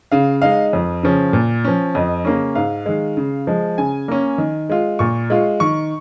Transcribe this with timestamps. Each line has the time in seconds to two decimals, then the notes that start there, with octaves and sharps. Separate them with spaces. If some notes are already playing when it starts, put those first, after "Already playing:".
0.12 C#3 F5
0.42 G#3 D#4 F5
0.73 F2
1.03 C#3 F3 C#4
1.33 A#2
1.64 F3 C#4
1.95 F2 D#5
2.25 C#3 A#3 C#4
2.55 G#2 F5
2.86 D#3 G#3
3.17 C#3
3.47 F3 G#3
3.78 C#3 G#5
4.08 A#3 C#4
4.38 D#3
4.69 G#3 F4
4.99 A#2 C#6
5.30 G#3 F4
5.60 D#3 C#6